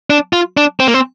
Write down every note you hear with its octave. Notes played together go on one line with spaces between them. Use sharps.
D4
F4
D4
C4
A#3
C4